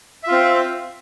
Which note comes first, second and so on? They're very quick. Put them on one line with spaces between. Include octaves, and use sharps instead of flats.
E5 F4 C4